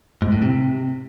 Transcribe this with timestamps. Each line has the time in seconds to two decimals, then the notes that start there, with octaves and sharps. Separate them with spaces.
0.22 G#2
0.32 A2
0.42 C3